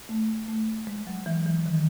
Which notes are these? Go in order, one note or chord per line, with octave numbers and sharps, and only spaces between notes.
A3
A3
G#3
F#3
E3
E3
D#3